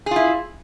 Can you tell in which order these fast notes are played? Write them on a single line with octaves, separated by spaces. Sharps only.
G#4 F4 E4